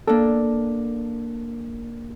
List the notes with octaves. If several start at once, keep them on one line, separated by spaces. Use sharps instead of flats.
A#3 D4 A4